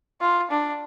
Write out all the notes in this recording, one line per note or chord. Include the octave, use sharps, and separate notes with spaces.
F4
D4